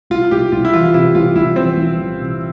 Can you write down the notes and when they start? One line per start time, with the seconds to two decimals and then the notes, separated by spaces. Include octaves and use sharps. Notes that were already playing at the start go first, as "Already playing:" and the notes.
0.10 C2 F4
0.31 C2 G4
0.52 C2 F4
0.65 E4
0.73 E3 F4
0.84 F4
0.94 C3 E4
1.15 C2 F4
1.36 C2 E4
1.56 E3 C4
1.77 C2
1.98 E3
2.18 C3